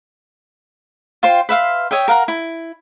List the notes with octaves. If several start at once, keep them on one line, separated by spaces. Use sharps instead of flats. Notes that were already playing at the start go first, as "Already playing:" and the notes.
F4 C5 G5
B4 E5 F5 C6
C#5 D#5 E5 G5
A#4 F5 F#5 A#5
E4